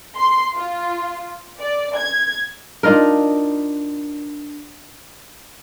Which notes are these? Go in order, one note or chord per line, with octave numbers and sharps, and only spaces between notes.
C6
F4
D5
G#6
D4 D#4 F4 A#4